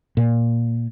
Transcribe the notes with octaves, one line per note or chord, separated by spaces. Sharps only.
A#2